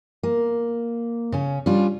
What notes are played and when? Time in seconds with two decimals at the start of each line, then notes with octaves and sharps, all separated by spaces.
0.23 A#3
1.32 C#3 C#4
1.66 G3 C#4 D4 F4